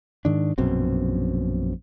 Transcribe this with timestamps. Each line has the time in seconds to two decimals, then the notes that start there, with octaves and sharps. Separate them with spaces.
0.25 G#2 D#3 D4
0.58 A#1 F#2 B2 C4